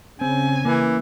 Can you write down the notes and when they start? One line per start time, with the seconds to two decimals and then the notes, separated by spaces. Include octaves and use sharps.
0.21 C#3 C4 G#5
0.65 E3 A#3